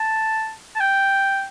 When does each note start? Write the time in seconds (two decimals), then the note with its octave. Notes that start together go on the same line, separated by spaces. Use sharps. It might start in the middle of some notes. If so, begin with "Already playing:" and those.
Already playing: A5
0.76 A5
0.80 G5